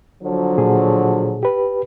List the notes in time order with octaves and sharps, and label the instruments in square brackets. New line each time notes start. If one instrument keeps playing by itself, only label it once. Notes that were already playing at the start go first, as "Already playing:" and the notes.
[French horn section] D3 F3 F#3
[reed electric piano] A#2 G#4
G4 B4